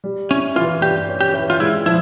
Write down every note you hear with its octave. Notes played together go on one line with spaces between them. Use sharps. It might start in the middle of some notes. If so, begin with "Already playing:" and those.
G3
C#4 E4
E3 F4
G2 G4
C#4
G4
E3
F4
G#3 E4
F3 E4